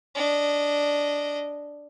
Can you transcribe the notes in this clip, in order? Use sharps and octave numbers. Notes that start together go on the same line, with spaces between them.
D4 D#5